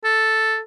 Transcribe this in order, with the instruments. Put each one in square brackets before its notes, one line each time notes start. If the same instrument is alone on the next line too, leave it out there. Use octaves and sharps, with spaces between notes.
[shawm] A4